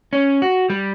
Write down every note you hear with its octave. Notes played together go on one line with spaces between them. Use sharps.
C#4
F#4
G3